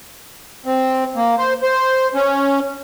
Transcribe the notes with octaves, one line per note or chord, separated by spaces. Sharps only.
C4
A#3
C5
C5
C#4